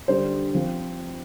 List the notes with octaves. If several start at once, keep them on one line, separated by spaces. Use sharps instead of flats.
D3 G3 D4 C5
F3 C4